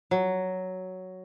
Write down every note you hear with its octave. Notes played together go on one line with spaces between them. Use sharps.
F#3